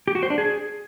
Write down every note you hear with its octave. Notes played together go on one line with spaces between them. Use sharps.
G4
F#4
C5
D4
G#4